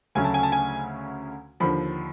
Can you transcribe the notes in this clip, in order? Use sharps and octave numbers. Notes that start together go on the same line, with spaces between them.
D2 C#3 F#3 A3 C#4 G#5
A5
G#5
A5
G#5
D#2 D3 F3 B5